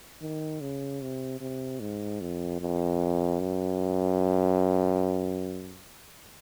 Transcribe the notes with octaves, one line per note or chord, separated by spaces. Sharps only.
D#3
C#3
C3
C3
G#2
F2
F2
F#2